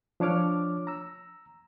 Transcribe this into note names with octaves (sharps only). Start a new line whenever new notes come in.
F3 D4 C#5 D6 F6
A#5 E6